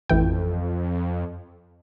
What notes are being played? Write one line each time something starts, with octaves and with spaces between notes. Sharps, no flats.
A1 F2 E3 G5